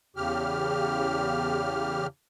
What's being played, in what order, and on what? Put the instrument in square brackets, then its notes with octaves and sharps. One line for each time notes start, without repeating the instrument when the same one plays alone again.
[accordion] E2 C#3 G4 F6